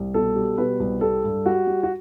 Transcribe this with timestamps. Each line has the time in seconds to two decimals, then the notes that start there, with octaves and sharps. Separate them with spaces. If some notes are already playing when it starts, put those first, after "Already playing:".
Already playing: C2
0.14 B2 A4
0.36 G3
0.58 B2 B4
0.80 C2
1.01 G3 A4
1.24 G2
1.46 G3 F#4
1.67 G3
1.83 F#4